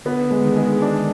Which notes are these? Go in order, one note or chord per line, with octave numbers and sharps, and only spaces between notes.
D3 B3
G#3
D#3
G#3
D4